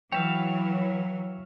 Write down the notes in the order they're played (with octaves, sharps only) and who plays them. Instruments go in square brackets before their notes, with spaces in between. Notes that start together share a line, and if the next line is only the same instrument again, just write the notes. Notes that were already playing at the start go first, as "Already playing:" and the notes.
[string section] E3 [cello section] F#3 [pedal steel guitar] C#5 E5 F5 [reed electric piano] G5